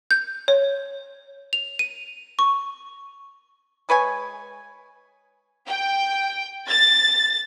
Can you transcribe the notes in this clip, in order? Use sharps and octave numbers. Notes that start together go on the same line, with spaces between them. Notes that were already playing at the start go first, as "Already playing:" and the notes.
G6
C#5
F7
D#7
C#6
G#3 B4 C#5 G#5
G5
A6